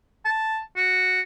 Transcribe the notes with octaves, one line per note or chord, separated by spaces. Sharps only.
A5
F#4